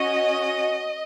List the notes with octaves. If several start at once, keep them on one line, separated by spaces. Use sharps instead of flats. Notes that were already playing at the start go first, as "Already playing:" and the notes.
Already playing: C#4 F#4 D#5